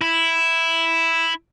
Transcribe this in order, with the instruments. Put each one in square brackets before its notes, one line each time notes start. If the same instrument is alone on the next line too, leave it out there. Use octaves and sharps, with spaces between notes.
[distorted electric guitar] E4